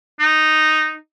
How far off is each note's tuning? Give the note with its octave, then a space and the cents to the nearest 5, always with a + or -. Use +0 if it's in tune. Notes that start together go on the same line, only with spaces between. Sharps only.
D#4 -5